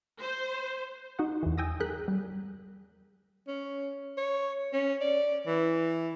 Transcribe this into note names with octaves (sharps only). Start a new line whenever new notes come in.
C5
D#4 F#4 F#5
E2 E3
G5 G#5 D#6 E6 A#6
G2 G#4 A#4 F#6 G6 B6
G3
C#4
C#5
C#4
D5
E3